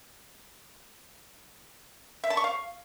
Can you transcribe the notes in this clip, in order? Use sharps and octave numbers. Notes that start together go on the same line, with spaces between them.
E5
A5
C#6
F5